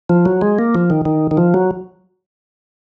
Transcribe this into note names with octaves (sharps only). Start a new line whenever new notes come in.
F3
F#3
G#3
A#3
F3
D#3
D#3
D#3
F3
F#3